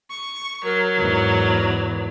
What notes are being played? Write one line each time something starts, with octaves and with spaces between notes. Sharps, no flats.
C#6
F#3 A#4
E2 G#2